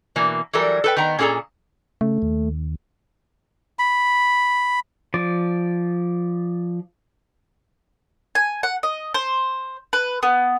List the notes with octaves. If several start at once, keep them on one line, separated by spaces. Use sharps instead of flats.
B2 E3 A#3
E3 F#3 G3 A4 A#4
A4 B4 G5
D#3 B3 G5 A#5
A#2 C#4 G#4 A4 A#5
C#3 A3
D#2
B5
F3 D5
G#5
F#5
D#5
C5
B4
B3